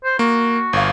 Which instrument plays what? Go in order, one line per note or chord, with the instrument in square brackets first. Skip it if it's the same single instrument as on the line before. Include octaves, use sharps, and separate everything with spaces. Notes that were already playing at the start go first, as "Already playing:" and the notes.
[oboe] C5
[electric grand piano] A#3 [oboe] F#4
[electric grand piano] G1 F5